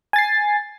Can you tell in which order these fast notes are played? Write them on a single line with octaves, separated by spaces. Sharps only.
G#5 A6 C7